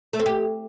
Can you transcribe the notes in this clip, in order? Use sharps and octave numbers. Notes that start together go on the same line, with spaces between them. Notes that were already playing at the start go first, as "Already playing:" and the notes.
A3
C4
G4